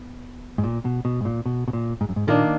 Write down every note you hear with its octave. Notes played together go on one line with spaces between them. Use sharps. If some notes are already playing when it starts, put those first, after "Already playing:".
Already playing: B3
G#2
A#2
B2
B2
G#2
A#2
B2
B2
A#2
G#2
F#2
G#2
A#2 D#3 A#3 D4